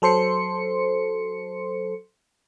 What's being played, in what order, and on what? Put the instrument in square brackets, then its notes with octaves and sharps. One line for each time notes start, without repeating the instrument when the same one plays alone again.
[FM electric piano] F#3 A4 C5 C6 C#7